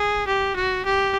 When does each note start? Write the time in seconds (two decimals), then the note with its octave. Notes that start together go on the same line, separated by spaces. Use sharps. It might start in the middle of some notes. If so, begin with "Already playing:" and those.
Already playing: G#4
0.27 G4
0.56 F#4
0.85 G4